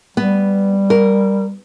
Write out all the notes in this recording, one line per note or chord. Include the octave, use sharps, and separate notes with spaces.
G3 B3
A#4